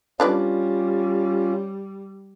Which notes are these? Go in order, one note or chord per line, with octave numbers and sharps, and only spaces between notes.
G3 C#4 D4 F4 B4 D5